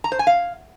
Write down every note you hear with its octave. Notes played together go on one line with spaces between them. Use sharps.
A#5
C5
G#5
F5